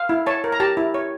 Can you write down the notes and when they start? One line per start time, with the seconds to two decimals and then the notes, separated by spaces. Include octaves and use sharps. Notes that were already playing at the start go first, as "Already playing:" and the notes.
Already playing: F5
0.09 E4
0.26 C#5 A5
0.44 A#4
0.52 A#5
0.60 G4 A5
0.77 E4
0.94 C#5